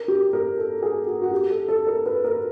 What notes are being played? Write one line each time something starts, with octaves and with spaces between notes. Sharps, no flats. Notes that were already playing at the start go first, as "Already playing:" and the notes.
Already playing: A#4
G4
A#4
A4
G#4
F#4
F#4
G4
A4
A4
A#4
B4
A#4